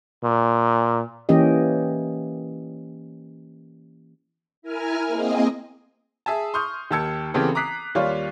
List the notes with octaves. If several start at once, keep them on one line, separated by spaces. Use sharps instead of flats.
A#2
E3 A#3 C#4 G4 D#5
E4 A#4 G#5 F6
A#3 C4 G#4 D#5
G#4 E5 G#5 A5
C6 C#6 D#6 F6 G6
D#2 G4 A5 E6 G#6 C#7
C#3 E3 B3 C4 G4 A4
A#5 D6 D#6 F#6 B6 C7
D#2 G3 F4 C#5 D5 F5